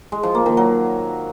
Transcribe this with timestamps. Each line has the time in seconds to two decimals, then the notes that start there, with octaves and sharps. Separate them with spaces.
0.12 G#3
0.23 F3
0.35 A#3
0.46 D#3
0.57 F#3